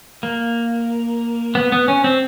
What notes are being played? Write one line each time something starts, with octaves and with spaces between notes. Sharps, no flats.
A#3
B3
B3
C#4
C4